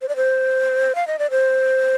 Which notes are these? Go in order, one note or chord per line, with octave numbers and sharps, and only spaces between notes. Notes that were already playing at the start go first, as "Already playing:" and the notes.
C5
D5
C5
F5
D#5
D5
C5